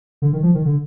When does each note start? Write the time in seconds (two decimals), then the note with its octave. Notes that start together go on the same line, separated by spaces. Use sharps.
0.22 D3
0.33 D#3
0.43 F3
0.54 D#3
0.65 D3